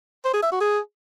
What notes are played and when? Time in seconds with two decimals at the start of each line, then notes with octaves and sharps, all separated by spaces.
0.25 C5
0.34 G#4
0.43 E5
0.52 F#4
0.61 G#4